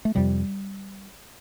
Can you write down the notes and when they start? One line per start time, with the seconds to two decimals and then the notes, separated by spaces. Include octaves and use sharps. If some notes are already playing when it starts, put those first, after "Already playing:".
0.05 A3
0.15 F2 C3 G3